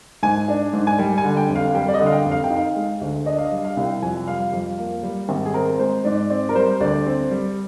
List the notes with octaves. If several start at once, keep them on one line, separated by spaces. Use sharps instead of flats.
G#2 G#5
D4
G#2
G#5
G3 G5
G#5
D3
G5
F1
F5
G3 G5
D5
D#5
D3
F5
G5
F1
F5
G5
D#4
F5
G#3
D2
D4 D#5
F5
D#5
G3
F5
C2
G5
F2 G#5
G3 F5
F2 F5
A#3
G3
G#1
G#4
C4 A#4
G#3 C5
G#2 D5
C4 D5
A#4
G3 C5
D2 D5
C4
G3